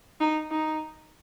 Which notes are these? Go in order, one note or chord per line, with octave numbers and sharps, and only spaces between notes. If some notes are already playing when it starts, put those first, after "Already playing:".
D#4
D#4